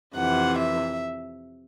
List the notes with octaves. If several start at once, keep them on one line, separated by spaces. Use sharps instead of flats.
F2 C3 E3 F#5
E5